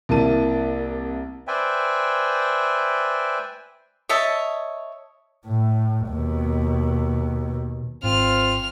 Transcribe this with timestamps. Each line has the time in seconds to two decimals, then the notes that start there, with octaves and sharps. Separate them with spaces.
0.09 C2 A#3 E4 A5 D#7
1.48 B4 C5 D5 E5 G5 G#5
4.09 C#5 D#5 E5 A5
5.46 A2
6.08 D#2 B2
8.04 G#1 C4 F4 F6